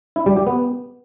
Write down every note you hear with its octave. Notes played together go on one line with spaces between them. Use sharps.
E4
G3
G4
B3